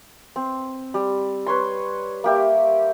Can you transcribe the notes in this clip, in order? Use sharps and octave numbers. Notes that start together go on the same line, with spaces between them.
C4
G3
B4 C#5 C6
A#3 G4 E5